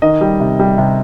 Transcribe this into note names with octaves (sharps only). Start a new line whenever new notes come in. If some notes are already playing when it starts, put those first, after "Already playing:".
D#3 D#5
G3
C3
G3
C3